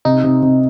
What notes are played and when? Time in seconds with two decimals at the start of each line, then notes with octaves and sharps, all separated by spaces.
0.05 C3 D#4
0.24 C3
0.42 C3